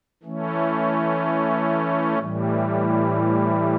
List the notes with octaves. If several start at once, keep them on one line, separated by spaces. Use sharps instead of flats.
E3 A3 C#4
A2 E3 G3